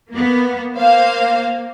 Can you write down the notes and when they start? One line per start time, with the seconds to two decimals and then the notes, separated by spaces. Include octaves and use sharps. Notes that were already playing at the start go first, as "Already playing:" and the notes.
0.11 A#3 B3
0.76 A#3 C5 F5